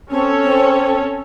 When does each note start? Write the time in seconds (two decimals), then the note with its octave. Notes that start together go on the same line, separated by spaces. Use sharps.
0.11 C4 C#4 A4 C#5
0.43 C4